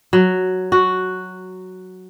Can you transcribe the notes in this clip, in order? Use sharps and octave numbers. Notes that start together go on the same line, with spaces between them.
F#3
F#4